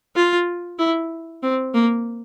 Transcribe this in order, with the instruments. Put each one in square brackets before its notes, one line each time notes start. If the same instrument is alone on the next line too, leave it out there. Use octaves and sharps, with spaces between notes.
[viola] F4
E4
C4
A#3